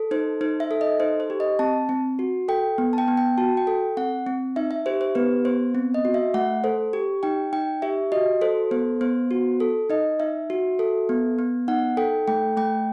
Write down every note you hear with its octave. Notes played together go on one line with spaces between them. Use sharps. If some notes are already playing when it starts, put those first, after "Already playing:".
Already playing: A4
D#4 C5
D#4 C5
E5
A4
D#5
D#4 C5
C5
G4
D#5
C4 A5
C4
F#4
A4 G5
B3
A5
G5
B3
G5
F#4 A5
G5
A4
C4 F#5
C4
D#4 E5
E5
G4 C5
C5
B3 B4
B3 C5
C4
D#5
F#4
E5
A3 F#5
A4 C5
G4
D#4 G5
D#4 G5
G4 E5
F#4 D#5
A4 C5
B3 C5
B3 C5
F#4
A4
D#4 D#5
D#4 E5
F#4
A4
B3
B3
D#4 F#5
A4 G5
A3 G5
A3 G5